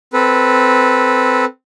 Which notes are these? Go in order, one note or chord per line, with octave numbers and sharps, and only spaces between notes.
C4 A4 B4